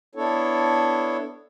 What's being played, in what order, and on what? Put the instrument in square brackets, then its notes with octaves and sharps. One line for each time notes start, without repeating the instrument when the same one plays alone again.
[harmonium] B3 D4 E4 A4 C#5